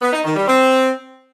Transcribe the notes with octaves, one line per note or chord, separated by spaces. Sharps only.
B3
D#4
D#3
G3
C4